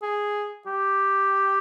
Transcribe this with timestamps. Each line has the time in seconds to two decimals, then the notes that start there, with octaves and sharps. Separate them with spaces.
0.03 G#4
0.66 G4